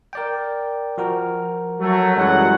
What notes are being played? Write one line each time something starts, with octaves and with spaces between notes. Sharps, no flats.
A#4 D5 G5
F3 F#4 A#4
F#3 A3
F#2 E3 G3 G#3 F#5